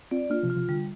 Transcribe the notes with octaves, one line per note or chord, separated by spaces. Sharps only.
C4 F4 D5
A#3 D4 F4
C3 F3
F4
C3 F3
D3 G3